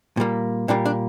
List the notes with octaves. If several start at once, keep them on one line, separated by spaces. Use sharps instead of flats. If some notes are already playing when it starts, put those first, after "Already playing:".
A#2 G3 A#3
A#2 G3 A#3 D4
D4